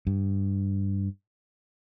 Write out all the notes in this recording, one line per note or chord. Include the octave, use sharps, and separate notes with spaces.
G2